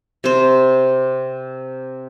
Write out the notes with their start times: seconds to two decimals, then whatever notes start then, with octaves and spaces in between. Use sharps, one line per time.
0.24 C3 C5